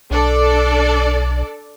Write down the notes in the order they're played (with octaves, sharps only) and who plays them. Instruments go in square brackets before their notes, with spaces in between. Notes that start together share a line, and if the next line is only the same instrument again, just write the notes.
[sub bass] B1 [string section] D4 A4 D5